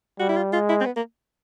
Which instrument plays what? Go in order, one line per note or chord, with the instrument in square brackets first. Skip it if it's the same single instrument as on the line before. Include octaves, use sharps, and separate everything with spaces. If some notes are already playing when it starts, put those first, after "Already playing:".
[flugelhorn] G3 [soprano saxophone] F#4
[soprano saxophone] E4
F4
[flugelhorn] G#3 [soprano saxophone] F4
[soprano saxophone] E4
C4
B3
A#3